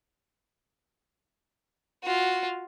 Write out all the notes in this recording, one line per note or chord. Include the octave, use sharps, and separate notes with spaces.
F4 F#4